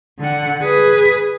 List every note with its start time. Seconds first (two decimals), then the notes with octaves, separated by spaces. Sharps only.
0.19 D3 F#5
0.63 G#4 B4